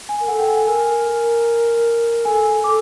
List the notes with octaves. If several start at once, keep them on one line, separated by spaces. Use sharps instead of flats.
G#5
A#4
A4 F#5
G5
G#5
A#4 G#5
A4 G#5
A4 D6